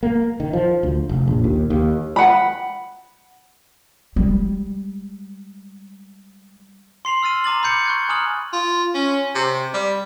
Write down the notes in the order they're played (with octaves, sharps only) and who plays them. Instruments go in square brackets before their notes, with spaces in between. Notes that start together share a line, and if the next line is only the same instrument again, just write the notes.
[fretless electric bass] A#3
D#3
F3
D2
F1
A#1
D#2
D#2
[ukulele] F#5 B5
[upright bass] G3 G#3
[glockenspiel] C6 C7 F7 F#7
E6 F6 A6 D#7
A#5 D6 A6 F#7
B5 D6 G6 C#7
C#6 F#6 G#6
G#5 A#5 D#6 F6 F#7
[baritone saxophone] F4
C#4
C3
G3